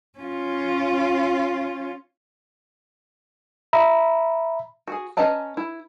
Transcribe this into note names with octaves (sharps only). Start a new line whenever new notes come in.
C#4 F4
E5 A#5 B5
F#4 G#4
C#4 B4 D#5 A5 A#5
E4